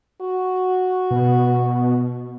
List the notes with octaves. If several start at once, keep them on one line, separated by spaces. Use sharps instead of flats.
F#4
B2